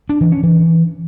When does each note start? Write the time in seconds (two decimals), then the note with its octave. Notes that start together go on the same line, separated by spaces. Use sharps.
0.09 D4
0.21 E3
0.32 C#4
0.43 E3